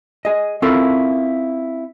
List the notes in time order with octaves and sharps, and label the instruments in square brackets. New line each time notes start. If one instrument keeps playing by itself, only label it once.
[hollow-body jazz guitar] G#4 D#5
C4 C#4 E4 F4 A4 A#4